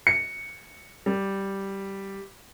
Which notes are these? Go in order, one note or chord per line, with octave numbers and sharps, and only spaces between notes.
C#7
G3